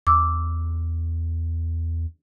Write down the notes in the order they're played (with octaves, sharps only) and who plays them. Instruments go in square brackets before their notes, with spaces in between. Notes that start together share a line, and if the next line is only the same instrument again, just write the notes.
[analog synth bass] E2 [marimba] D6 E6